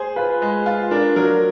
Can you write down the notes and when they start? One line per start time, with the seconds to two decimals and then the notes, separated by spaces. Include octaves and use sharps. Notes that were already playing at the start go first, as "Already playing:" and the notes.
Already playing: G#4 C5
0.16 F4 B4
0.42 G#3
0.66 F4
0.91 D4 A#4
1.16 F#3 A#4